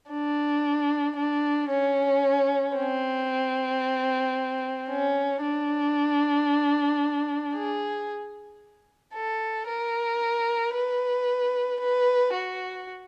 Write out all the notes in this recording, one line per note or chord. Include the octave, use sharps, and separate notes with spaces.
D4
D4
C#4
C4
C#4
D4
G#4
A4
A#4
B4
B4
F#4